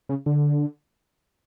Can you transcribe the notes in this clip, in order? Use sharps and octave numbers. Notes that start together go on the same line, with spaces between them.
C#3
D3